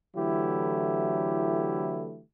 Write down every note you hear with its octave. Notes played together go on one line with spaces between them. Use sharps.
D3 E3 F#3 A3 E4 G4